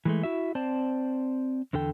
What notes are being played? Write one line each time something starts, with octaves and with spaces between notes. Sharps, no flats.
E3 G#3 A3
E4 F#4 E5
C4 C5 D5 A5
E2 D3 A4 G5